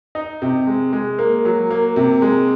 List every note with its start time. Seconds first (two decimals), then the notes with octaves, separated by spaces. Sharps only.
0.15 D#4
0.42 C3
0.67 G#3
0.93 G#3
1.19 A#3
1.45 F#3
1.70 A#3
1.96 C3
2.22 G#3